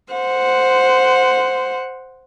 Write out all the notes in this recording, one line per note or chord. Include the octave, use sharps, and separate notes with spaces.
C5 F#5